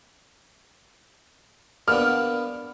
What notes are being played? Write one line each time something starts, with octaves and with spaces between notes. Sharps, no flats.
A#3 B3 D4 F6